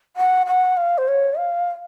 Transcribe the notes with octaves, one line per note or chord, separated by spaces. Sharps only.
F#5
F#5
F5
C5
C#5
F5